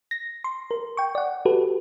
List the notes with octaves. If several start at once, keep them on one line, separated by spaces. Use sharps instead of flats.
A#6
C6
A#4
G5 C#6
D5 F#5
F#4 G4 A4 B4